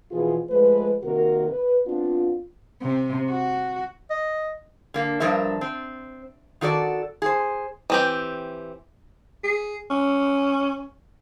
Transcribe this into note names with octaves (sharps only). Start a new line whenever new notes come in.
B2 E3 F3 F4 G#4
F3 G#3 A3 B4
C3 D#3 A#3 F#4 A#4
B4
B3 C4 D4 F4
C3
F#4
D#5
D3 A#3
G2 F3 D4 A#4 E5
C4
D#3 F#4 A4 D5
G#4 C5
E3 C4 G4
G#4
C#4